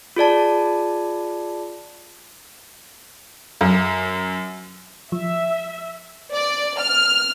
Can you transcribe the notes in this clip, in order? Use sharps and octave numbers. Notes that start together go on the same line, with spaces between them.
F4 G#4 D5 A5
F#2
F3 E5
D5
F6